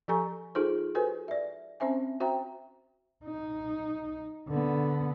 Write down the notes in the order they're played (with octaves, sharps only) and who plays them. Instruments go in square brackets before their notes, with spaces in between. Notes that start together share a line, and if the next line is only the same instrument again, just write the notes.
[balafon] F3 G4 A4 G#5 A#5 C#6
D#4 F4 G#4 A4 C5
F#4 A4 B4 C5 G#5
D5 E5
C4 C#4 C5 E5 G#5
F#4 C5 E5 G5 A#5
[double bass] D#4
D3 B3